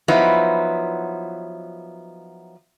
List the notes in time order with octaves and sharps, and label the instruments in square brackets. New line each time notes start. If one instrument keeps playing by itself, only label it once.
[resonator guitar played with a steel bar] F3 F#3 B3 D#4 E4